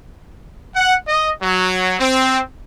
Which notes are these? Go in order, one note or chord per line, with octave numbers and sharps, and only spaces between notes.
F#5
D#5
F#3
C4